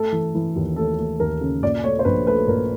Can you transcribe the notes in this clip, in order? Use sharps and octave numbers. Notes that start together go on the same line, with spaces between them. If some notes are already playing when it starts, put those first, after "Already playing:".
Already playing: A3 A4
E3
E3
D#2
A3 A4
A3
D#2 A#4
C#3
A#2 D5
A3 C#5
C5
A#1 B4
A3 B4
A#2 A#4